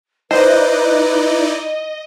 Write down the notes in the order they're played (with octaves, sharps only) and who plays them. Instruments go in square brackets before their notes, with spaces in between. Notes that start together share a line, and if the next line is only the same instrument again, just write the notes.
[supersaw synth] D#4 E4 D5 [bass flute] B4 [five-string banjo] C5 [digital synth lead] D#5